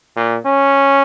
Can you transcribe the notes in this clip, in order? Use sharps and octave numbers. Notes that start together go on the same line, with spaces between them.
A#2
C#4